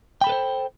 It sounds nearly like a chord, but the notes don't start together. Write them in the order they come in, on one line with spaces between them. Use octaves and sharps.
G5 B5 A4 B4 C5